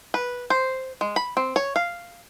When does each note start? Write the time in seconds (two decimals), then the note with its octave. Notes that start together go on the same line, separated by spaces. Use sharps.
0.14 B4
0.50 C5
1.01 G#3
1.16 B5
1.37 C4
1.56 C#5
1.76 F5